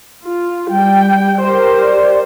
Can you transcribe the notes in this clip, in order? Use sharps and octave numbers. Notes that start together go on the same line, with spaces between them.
F4
G3 G5
G4 A#4 C5
D5